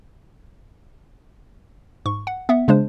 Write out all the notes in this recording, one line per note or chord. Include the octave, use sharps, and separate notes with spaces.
G#2 C#6
F#5
B3 E5 F#5
C#3 G#3 D4 C5